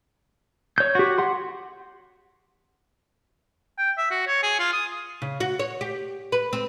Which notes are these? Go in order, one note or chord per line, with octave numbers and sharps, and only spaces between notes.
C#5 G6
F#4 G4
G4 F#5 C6
G5
E5
F#4
C#5
G#4
F4
D#6
C#3
F#4
C#5
G4
B4
C4